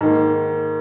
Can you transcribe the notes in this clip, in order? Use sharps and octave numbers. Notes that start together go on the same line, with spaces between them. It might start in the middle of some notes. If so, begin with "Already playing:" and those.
G#2 D#3 A#3